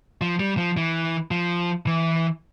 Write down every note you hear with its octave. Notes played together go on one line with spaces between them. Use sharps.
F3
G3
F3
E3
F3
E3